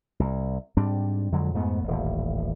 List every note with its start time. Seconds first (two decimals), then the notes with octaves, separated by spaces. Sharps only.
0.20 C2
0.77 G#2 G3 C4 D4
1.32 F2 D3 F#3 G#3
1.54 F2 G#2 A3 B3
1.84 D#1 A1